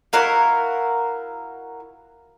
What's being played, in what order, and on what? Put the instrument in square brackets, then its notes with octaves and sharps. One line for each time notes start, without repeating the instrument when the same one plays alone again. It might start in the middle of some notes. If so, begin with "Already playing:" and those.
[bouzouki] E4 F#4 A#4 F5